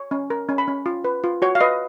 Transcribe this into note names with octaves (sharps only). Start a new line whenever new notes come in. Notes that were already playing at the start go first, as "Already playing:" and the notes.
Already playing: C#5
C#4
A#4
C#4
B5
C#4
F4
B4
F4
F#4 C#5
F5
B4 D#5